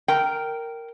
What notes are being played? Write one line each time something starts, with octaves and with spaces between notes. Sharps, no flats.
A#4 G5